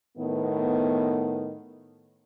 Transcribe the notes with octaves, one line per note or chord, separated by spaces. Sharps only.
A2 D#3 B3